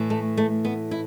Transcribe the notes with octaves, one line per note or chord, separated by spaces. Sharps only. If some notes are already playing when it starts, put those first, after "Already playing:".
Already playing: A2 E3
A3
A3
B3
E4